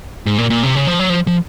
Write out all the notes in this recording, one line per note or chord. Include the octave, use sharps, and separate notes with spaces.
G#2
A#2
A#2
C3
C#3
F3
F#3
F3
F3